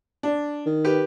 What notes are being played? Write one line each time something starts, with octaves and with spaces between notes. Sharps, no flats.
D4
D#3
G4 B4